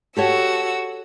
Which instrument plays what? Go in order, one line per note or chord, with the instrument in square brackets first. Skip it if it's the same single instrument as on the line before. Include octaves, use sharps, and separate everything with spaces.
[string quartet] F#4 E6 [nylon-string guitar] G4 A4 C#5